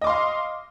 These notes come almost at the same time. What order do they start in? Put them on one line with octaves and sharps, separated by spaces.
D#5 D6 C6 F5